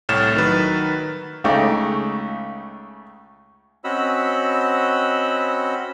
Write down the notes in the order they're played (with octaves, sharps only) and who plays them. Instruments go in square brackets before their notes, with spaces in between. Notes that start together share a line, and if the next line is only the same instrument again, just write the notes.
[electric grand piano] C2 A2 C#5 F6 A6 E7
D#3 F#3 B4
[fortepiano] C#2 C#3 A3 D#4 G5 D6
[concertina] C4 C#4 F#4 D#5 B5 E6